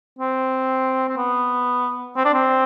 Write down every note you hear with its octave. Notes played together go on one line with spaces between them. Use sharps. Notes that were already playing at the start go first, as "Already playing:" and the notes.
C4
C4
B3
C4
D4
C4